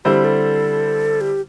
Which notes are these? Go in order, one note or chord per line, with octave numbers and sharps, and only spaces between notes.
D3 G3 C4 E4 G4 C5
A4
G4